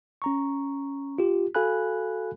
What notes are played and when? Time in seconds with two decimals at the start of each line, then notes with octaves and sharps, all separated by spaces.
0.22 C#4 A#5 C#6
1.18 F4 G4
1.55 F#4 A4 F5 G#5 B5 F#6